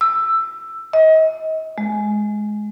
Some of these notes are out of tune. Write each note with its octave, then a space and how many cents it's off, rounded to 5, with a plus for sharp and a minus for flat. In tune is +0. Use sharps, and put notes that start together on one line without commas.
E6 +10
D#5 +35
G#3 +15